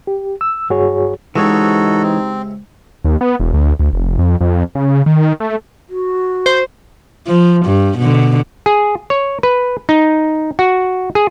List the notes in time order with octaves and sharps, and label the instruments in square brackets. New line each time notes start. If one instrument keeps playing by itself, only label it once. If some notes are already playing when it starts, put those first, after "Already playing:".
[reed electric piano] G4
E6
G2 F#4 G#4 C#5
[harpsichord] C#2 C3 [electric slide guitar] E3 G#3 C#5 [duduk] D#4 [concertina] F#4 A4
[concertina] C4
[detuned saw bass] D#2
B3
E1
D2
D2
F1
F2
F2
C#3
D#3
A3
[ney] F#4
[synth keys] C5
[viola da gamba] F3
G2
B2 D3
[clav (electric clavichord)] G#4
C#5
B4
D#4
F#4
G#4